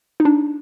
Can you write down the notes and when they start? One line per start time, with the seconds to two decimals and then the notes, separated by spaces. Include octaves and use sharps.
0.20 D#4
0.25 D4